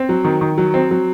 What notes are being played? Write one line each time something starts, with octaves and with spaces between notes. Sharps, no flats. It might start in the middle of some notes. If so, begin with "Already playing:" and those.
Already playing: C4
F#3
D#3
D#3
F#3
C4
F#3